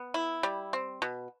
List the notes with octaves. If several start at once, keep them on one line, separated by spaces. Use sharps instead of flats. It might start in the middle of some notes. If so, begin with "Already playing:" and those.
Already playing: B3
E4
G3
C4
B2